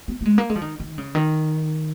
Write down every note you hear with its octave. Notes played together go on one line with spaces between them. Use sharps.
B3
A#3
G#3
A#3
G#3
F3
D#3
D#3
C#3
D#3